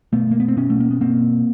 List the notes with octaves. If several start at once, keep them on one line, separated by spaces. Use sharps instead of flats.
B2 A3 B3
A#3
B3
C4
B2 B3 C#4
A3
A#3
B3
B2 A#3 C4